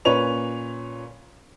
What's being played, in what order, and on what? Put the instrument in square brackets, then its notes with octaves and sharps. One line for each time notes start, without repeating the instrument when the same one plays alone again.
[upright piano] A#2 C#4 B4 C#5 F7